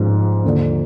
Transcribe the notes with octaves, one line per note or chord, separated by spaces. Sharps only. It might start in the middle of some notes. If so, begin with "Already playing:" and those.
Already playing: G#2 F3
D#2 D3 F3